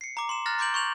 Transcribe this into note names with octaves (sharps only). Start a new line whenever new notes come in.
C7 C#7
A#5 D6
C6 E7
A#5 F6 F#6 A6 A#6
A#5 C6 D6 G6 D7 F#7
C#6 G6 F7 F#7